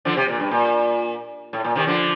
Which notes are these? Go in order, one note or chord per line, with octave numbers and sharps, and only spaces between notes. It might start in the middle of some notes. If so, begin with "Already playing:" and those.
D3 F3
C3
A#2
G2
A#2
A2
A#2
C3 D#3
D3 F3